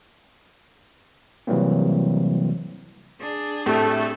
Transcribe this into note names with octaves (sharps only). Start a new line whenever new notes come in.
C3 E3 F#3 G3 A#3 C4
D4 G#4
A2 A3 C4 G4 A4